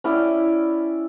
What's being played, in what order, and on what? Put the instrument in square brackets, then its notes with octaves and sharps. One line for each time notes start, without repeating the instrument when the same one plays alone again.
[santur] C#4 E4 D5 G5